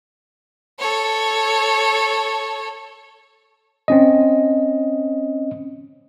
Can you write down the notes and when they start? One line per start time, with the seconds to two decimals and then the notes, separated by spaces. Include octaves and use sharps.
0.79 A4 C#5
3.88 C4 C#4 D#5